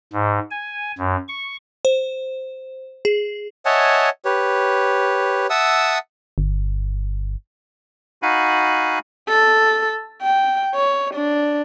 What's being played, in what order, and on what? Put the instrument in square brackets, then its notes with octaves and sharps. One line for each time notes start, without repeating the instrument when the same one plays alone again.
[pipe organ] G#2
G#5
F#2
C#6
[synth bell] C5
G#4
[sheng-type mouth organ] C#5 D#5 E5 F#5 G#5 A5
G4 B4 C#5
E5 F#5 A5 D#6 E6
[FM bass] G1
[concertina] D#4 F#4 F5 F#5 G#5 B5
[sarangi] A4
G5
C#5
D4